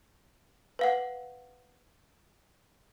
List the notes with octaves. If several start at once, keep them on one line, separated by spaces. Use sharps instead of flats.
B4 F5 F#5